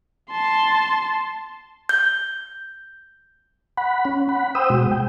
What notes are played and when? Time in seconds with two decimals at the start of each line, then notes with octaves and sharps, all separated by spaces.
0.31 A5 C6
1.89 G6
3.77 F#5 B5
4.05 C#4
4.29 F#5 B5
4.55 C5 G5 D#6 E6
4.70 B2 G#3 F#4
4.91 G5